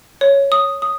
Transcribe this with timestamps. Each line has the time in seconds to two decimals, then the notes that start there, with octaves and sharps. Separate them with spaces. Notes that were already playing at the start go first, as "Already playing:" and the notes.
0.21 C#5
0.52 D#6
0.82 D#6